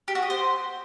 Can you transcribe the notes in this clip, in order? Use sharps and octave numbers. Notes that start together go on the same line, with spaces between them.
G4
F#4
D#5
C5